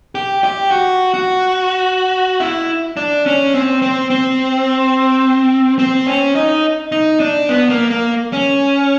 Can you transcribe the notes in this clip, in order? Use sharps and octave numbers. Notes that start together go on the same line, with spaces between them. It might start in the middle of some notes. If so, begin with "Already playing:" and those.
G4
G4
F#4
F#4
E4
D4
C#4
C4
C4
C4
C4
C#4
D#4
D#4
D4
B3
A#3
A#3
C#4